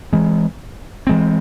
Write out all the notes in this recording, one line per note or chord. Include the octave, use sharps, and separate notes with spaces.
E3 G#3 C4
E3 G#3 C4